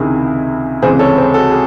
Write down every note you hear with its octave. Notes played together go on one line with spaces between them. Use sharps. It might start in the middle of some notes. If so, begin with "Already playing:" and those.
Already playing: C#2 C3 D#3 E4 G#4
C#2 C3 E3 G#3 G#4 C5
A4 C#5
G#4 C5
F#4 A4
G#4